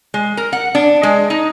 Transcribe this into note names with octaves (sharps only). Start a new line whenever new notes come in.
G#3
A#4
F#5
D4
G#3
D#4